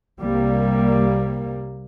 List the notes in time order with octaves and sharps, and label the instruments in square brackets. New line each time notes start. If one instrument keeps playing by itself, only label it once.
[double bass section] C2 C3 G3 A#3